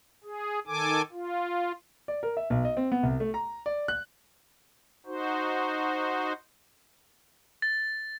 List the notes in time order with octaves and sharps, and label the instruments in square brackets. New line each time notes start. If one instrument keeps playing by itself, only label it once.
[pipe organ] G#4
D#3 A4 G#5 D6
F4
[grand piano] D5
A#4
E5
B1
D#5
C4
B3
C2
A3
A#5
D5
F#6
[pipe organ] D#4 F#4 C5
[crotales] A6